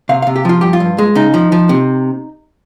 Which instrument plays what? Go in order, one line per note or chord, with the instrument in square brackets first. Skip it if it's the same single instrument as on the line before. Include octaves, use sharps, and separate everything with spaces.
[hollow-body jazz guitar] C3 F5
C3 F5
G4
F3 F4
G2 G4
F4
G2
G#3
C#3 D#4
F3
F3
C3